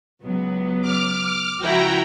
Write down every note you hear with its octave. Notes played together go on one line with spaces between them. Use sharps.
C#2 F#3 B3
D6 F6
C#2 F3 E4 F#4 G5 A#5